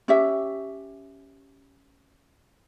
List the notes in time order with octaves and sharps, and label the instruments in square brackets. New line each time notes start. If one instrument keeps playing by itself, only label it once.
[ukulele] C#4 G4 E5